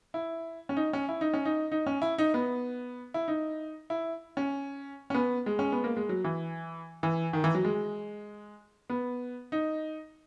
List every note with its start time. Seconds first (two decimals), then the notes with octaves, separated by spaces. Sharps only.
0.14 E4
0.69 C#4
0.77 D#4
0.93 C#4
1.09 E4
1.21 D#4
1.34 C#4
1.45 D#4
1.72 D#4
1.87 C#4
2.02 E4
2.18 D#4
2.34 B3
3.14 E4
3.28 D#4
3.90 E4
4.37 C#4
5.10 C#4
5.14 B3
5.46 G#3
5.59 C#4
5.72 B3
5.84 A#3
5.97 G#3
6.09 F#3
6.24 E3
7.03 E3
7.33 D#3
7.44 E3
7.55 F#3
7.65 G#3
8.90 B3
9.52 D#4